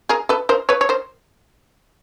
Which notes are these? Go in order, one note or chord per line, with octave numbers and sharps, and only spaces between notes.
G#4 A#4
A4 B4
A#4 C5
B4 C#5
C#5
A#4 C5